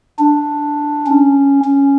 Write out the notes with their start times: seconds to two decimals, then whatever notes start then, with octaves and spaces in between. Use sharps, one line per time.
0.19 D4
1.07 C#4
1.64 C#4